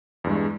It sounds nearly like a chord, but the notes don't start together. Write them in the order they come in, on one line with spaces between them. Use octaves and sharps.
E2 G2 G#3